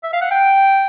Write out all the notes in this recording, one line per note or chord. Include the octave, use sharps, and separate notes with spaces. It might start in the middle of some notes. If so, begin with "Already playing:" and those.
E5
F5
F#5
G5